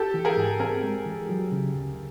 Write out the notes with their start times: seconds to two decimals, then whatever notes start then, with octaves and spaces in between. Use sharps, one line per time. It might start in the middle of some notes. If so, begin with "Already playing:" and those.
Already playing: G4 A4
0.14 E3
0.25 G#4 A#4
0.37 G#2
0.60 C4 G#4 A#4
0.83 G#3
1.06 E3
1.29 F#3
1.52 C#3
1.75 D2